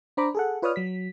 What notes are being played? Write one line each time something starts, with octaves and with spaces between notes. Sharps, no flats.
D4 C5 A#5 B5 D6
G#4 A4 F#5
F4 B4 C#5 D5 D#6 F6
F#3 B6